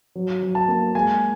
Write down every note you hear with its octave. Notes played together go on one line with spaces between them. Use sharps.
F#3
F#3
A5
A#3
G#3 G#5